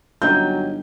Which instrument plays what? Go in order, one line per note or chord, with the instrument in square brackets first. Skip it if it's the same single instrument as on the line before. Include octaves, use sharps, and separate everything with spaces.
[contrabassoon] G1 [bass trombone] F#3 [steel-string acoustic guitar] C#4 D#4 G5 [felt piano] G6